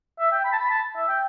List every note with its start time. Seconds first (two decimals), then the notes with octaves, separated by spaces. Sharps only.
0.20 E5
0.32 G5
0.44 B5
0.52 A5
0.58 B5
0.70 A5
0.96 E5
1.08 G5